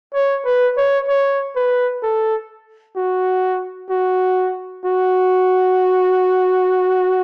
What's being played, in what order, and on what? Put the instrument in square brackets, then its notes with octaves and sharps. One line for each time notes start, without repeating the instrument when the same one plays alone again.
[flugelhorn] C#5
B4
C#5
C#5
B4
A4
F#4
F#4
F#4